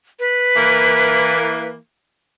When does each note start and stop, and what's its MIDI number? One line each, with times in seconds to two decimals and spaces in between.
0.19 1.69 71
0.56 1.76 52
0.56 1.76 58